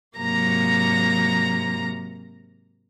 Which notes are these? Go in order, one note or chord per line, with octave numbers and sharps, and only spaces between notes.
G#2 C3 F#3 A#3 A#5 A#6